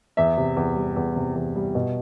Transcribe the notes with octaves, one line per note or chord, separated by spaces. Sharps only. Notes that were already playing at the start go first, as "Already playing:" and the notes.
E2 E5
C3
E2
G3
E2
C3
E2
G3
B2